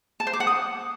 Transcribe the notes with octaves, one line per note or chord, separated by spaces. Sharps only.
A5
C5
D6
F#5
D#6